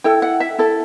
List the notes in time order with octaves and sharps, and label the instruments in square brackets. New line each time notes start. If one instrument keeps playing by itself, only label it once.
[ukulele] E4 A4 G5
F#5
E5
E4 A4